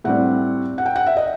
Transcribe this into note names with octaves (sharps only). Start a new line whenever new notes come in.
A2 G3 C4 F#5
F#5
G5
F#5
E5
D#5